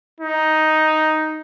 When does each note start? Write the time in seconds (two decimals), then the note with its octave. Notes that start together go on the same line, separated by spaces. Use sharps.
0.21 D#4